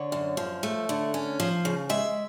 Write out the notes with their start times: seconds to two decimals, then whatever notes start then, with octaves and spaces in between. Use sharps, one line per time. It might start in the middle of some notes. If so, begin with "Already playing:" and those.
Already playing: D3 C#5
0.12 F#2
0.37 F3
0.63 A3
0.89 D3
1.14 C#4
1.40 F3
1.65 C#3
1.89 G#3 E5